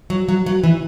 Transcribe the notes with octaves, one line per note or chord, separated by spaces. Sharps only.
F#3
F#3
F#3
E3